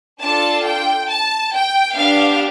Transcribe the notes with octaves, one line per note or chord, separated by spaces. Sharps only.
D4 F4 A4 A5
G5
A5
G5
B3 D4 G4 F5